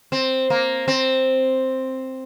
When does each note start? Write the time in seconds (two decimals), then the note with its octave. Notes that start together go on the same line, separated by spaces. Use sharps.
0.12 C4
0.50 A#3
0.88 C4